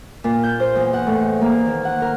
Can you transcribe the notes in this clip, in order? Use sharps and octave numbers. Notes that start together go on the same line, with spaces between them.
A#2
G6
C5
E2
F#5
A2
A#3
D#3
F#5
A#4